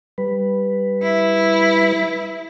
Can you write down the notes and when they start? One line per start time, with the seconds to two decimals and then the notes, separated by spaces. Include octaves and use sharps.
0.18 G3 B4
1.02 E4